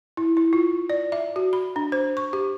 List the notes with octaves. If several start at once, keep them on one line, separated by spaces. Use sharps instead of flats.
E4
E4
F4
D5
E5
F#4
B5
D4
C5
C#6
G4